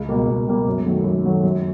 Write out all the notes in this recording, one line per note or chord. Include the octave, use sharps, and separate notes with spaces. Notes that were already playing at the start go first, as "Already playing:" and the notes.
Already playing: C#2
B2 G3 A#3
C#2
B2 G3 A#3
F#2
D#3 F#3 A3
F#2
D#3 F#3 A3
F#2